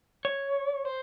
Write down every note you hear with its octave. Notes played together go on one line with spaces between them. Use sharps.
C#5
C5